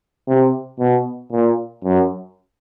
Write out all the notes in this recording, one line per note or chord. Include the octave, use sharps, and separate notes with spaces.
C3
B2
A#2
F#2